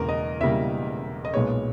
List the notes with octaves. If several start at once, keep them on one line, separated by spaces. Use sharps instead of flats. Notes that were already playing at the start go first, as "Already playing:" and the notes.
Already playing: E1 E2 C#3 A#3 A#4
D#5
E1 E2 C#3 G3 A#3 E5
D#5
B1 A#2 G#3 B3 C#5